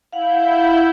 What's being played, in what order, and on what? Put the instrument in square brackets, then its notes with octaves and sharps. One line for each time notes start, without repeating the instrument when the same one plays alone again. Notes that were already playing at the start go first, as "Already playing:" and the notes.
[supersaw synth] E4 G6 [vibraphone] F5 F#5